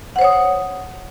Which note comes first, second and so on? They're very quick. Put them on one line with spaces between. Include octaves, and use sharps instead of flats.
F#5 C5 C#5 D#6